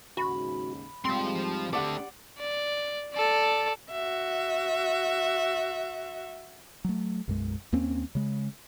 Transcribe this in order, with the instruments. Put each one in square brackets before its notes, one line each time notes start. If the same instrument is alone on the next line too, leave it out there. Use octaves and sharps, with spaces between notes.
[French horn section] D#2 G#2 C#3 [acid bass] F#4 [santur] B5
[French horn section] G#2 G3 G#3 [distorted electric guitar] F3 C6 [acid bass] C4
[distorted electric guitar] A3 D4 [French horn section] G4 [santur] D5 F#5
[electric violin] D5
A4 D5
[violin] F#4 E5
[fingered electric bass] F#3 A3
B1 F#2 G#3
D#2 A#3 C4 C#4
C#3 G#3